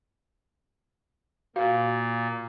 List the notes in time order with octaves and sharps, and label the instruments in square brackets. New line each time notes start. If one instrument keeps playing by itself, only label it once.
[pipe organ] A#2 [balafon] F#4 F5